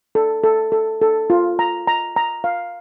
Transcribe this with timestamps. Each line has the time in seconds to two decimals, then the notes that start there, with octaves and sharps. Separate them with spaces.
0.15 A4
0.44 A4
0.72 A4
1.01 A4
1.30 F4
1.59 A#5
1.88 A#5
2.16 A#5
2.44 F5